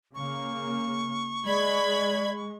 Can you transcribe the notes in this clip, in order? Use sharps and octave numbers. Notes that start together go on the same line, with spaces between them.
C#3 A#3 C#6
G#3 D5 B5 G#6